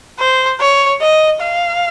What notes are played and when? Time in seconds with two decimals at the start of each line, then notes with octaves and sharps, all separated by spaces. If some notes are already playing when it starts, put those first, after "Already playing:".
0.20 C5
0.60 C#5
1.01 D#5
1.41 F5